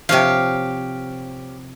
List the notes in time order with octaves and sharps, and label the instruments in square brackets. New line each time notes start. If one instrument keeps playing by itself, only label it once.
[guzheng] C3 F3 [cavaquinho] G4 C#5 F5